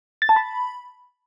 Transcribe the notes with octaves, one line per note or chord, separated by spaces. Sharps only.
A6
A5
B5